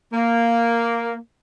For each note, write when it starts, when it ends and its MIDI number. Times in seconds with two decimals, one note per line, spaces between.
0.13 1.17 58